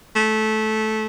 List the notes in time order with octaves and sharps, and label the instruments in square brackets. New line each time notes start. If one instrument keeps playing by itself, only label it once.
[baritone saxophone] A3